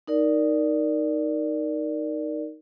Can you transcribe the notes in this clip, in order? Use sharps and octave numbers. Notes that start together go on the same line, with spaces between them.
D#4 A#4 D5